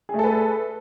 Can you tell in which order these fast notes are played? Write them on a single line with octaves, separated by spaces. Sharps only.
G#4 A3 A4 B4